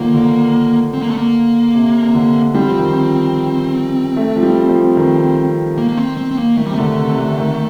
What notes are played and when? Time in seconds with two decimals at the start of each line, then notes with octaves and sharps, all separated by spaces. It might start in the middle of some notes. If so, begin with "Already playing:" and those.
Already playing: D3 D#3 F3 A#3
0.14 D3
0.94 C4
1.02 A#3
1.11 A3
1.18 A#3
1.75 C3
2.03 C3
2.14 D3
2.54 G3 C4
2.67 F3
2.79 D#3
2.90 F3
4.17 A3
4.36 F3
4.43 G3
4.69 F3
4.97 D#3
5.78 A#3
5.89 A#3
5.97 C4
6.17 C4
6.31 C4
6.37 A#3
6.57 D#3 A3
6.66 G3
6.70 C3
6.75 D3 A3
6.98 C3
7.10 C3
7.18 D3
7.38 D#3